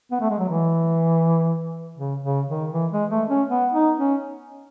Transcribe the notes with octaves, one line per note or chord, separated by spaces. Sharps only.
B3
A3
G#3
F#3
E3
C#3
C#3
D#3
E3
G#3
A3
C#4
B3
D#4
C#4